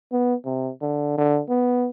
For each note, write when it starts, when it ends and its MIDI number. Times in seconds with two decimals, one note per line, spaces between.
0.12 0.35 59
0.46 0.71 48
0.82 1.18 50
1.18 1.41 50
1.49 1.89 59